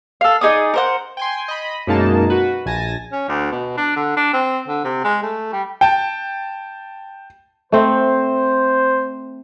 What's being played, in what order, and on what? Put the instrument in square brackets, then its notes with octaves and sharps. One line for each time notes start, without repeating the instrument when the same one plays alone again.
[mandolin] A4 F5
D#4 G#4 D5 D#6
A#4 C5 F#5
[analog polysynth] G5 G#5 C6
D#5 B5
F#2 B2 G#3 A#3 D#4 A5
F#4 B4
A#1 G#5 A5 A#6
[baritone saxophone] C#4
D2
B2
D4
D3
D4
C4
D3
C3
G#3
A3
G3
[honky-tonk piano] G5 A5
[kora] A3 C4 [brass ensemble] C5